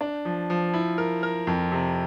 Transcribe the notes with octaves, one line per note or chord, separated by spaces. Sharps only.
D4
F3
F3
E4
A#4
A#4
F2
C3